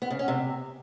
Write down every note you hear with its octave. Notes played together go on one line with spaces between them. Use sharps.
B3
C#3
C#4
C3